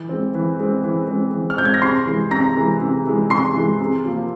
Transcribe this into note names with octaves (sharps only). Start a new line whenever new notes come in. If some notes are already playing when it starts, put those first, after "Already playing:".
Already playing: E3
G#3 C4
E3
G#3 C4
E3
G#3 C4
E3
F6
G#3 C4 G6
G#6
A#6
C3 C6 C7
E3 G#3
C3 A#5 A#6
E3 G#3
C3
E3 G#3
C3 C6 C7
E3 G#3
C3
F3 A#3